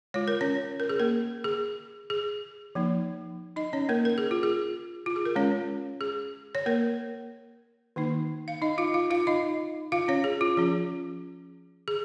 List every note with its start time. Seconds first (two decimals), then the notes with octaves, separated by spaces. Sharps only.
0.14 G#3 F4 C#5
0.28 A#4
0.41 C#4 C#5
0.80 A#4
0.89 G#4
1.00 A#3 A#4
1.44 G#4
2.10 G#4
2.75 F3 A#3 D#4
3.56 D#4 D#5
3.73 C#4 C#5
3.89 A#3 A#4
4.05 A#4
4.18 G#4
4.31 F4
4.43 G#4
5.06 F4
5.16 G#4
5.26 A#4
5.36 G#3 C#4 F4 C#5
6.01 G#4
6.55 C#5
6.66 A#3 A#4
7.96 D#3 A#3 D#4
8.48 F5
8.62 D#4 D#5
8.78 F4 F5
8.94 F4 F5
9.11 F4 F5
9.27 D#4 D#5
9.92 F4 F5
10.08 C#4 C#5
10.24 G#4
10.41 F4
10.57 F3 C#4 F4 G#4
11.88 G#4